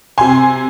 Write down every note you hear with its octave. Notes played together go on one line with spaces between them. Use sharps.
C3 G#5 C6